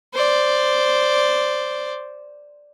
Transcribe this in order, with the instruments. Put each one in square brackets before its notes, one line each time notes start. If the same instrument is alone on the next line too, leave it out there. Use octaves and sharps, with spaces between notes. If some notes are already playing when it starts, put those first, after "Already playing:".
[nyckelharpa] C5 D5